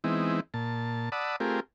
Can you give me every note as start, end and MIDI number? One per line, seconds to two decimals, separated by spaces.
0.04 0.40 52
0.04 0.40 56
0.04 0.40 59
0.04 0.40 60
0.04 0.40 63
0.04 0.40 64
0.54 1.09 46
0.54 1.09 81
1.12 1.36 74
1.12 1.36 78
1.12 1.36 81
1.12 1.36 83
1.12 1.36 87
1.12 1.36 88
1.40 1.60 57
1.40 1.60 60
1.40 1.60 65
1.40 1.60 67
1.40 1.60 68
1.40 1.60 70